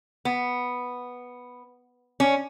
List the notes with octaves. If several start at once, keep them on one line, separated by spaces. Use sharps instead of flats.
B3
C#4